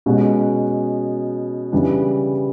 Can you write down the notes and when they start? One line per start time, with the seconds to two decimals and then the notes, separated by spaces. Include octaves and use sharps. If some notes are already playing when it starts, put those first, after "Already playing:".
0.06 B2 G#3 C#4 F#4
1.72 C#3 E3 G3 B3 D4